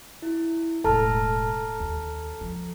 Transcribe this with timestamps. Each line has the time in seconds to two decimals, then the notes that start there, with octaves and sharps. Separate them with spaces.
0.22 E4
0.84 E1 A2 A4 A5 A#5 F6
1.80 D#2
2.41 F3